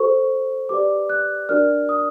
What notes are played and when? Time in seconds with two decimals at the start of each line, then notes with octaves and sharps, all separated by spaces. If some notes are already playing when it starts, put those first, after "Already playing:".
Already playing: F#4 A4 C5 C#6
0.69 G4 B4 D5 D6
1.10 F#6
1.49 D4 F#4 A#4 D5 F6
1.89 D#6